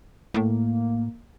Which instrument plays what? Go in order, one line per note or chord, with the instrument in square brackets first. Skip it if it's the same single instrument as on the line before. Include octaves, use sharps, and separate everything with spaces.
[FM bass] A2 [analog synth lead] A#3